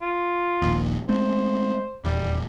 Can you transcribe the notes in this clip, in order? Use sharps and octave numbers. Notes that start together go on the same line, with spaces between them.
F4
D#1 A#1 D#2
G#3 A3 C4 C5
D#1 E2 G3